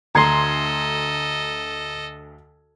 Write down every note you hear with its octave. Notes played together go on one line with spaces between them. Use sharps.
D2 A4 D#5 A#5 C6 G#6 C7